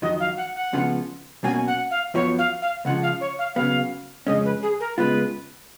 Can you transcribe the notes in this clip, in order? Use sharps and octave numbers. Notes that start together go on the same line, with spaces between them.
F2 D#3 F#3 D#5
F5
F#5
F#5
C#2 C#3 F3 B3 F4
B1 B2 A#3 C#4 F#4 G#5
F#5
F5
F#2 F3 B3 F#4 C#5
F5
F5
C#2 C#3 F3 F#5
F5
C#5
F5
C#3 F#3 B3 F5
F2 C#3 G#3 C#4 D#5
B4
G#4
A#4
C#3 G#3 B3 F4 B4